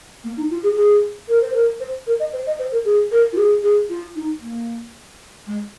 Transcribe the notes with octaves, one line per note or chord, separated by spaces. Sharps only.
A#3
D#4
F4
G#4
G#4
A#4
C5
A#4
C5
A#4
D#5
C5
D#5
C5
A#4
G#4
A#4
F4
G#4
G#4
F4
D#4
A#3
G#3